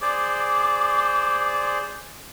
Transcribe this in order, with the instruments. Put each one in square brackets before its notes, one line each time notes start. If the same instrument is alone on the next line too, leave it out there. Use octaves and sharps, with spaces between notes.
[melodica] G#4 C5 D5 [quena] D6